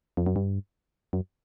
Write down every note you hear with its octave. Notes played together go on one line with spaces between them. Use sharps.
F2
F#2
G2
F#2